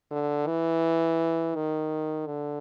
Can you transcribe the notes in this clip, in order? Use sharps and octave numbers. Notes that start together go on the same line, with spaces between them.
D3
E3
D#3
D3